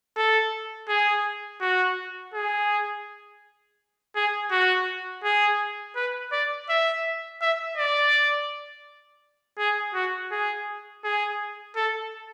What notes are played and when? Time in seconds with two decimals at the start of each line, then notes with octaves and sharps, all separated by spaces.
0.16 A4
0.89 G#4
1.61 F#4
2.34 G#4
4.15 G#4
4.51 F#4
5.24 G#4
5.95 B4
6.32 D5
6.69 E5
7.41 E5
7.77 D5
9.58 G#4
9.94 F#4
10.31 G#4
11.04 G#4
11.76 A4